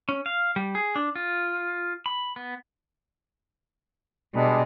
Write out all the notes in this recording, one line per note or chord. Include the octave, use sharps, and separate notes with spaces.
C#4
F5
G3
G#4
D4
F4
B5
B3
B2 G3 G#3 D4